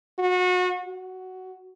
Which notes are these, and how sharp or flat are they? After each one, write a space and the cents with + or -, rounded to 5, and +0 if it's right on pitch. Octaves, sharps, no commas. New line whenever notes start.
F#4 -30
F#4 +10